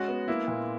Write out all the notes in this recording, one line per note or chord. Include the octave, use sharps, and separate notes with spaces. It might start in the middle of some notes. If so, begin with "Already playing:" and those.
Already playing: G#3 C#4 F#4
B3
A#3 E4
A#2